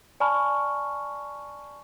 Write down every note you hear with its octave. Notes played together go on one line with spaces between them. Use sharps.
D5 G#5 A5 B5 C#6 F6